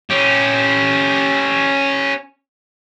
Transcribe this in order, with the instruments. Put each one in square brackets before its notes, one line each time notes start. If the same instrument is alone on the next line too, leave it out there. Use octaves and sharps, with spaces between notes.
[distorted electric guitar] C#4 G4